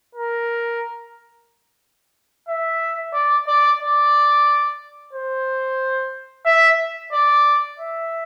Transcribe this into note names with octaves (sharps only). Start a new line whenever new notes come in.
A#4
E5
D5
D5
D5
C5
E5
D5
E5